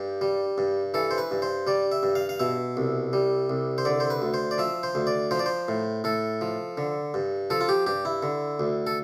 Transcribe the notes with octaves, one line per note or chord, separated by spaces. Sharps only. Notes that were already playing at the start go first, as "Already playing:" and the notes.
Already playing: G2 G4
G3
G2
E3 A4
C5
B4
G2
C5
G3 D5
E5
G2
F5
F5
B2 E5
C2
G3
C2
C5
D3 D5
C5
B4
D2
C5
D5
F3 E5
C5
D2
D5
F3 C5
D5
C5
A2
A2 A4
F3
D3
G2
F3 A4
F4
G4
G2 G4
E4
D3
D2
A4